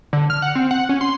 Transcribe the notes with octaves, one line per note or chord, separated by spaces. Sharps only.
D3
F6
F#5
C4
F#5
C#4
C6